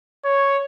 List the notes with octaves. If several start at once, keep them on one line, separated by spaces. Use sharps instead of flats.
C#5